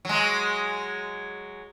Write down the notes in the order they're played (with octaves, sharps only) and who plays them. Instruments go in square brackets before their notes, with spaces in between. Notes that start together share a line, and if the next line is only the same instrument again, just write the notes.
[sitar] F#3 G#3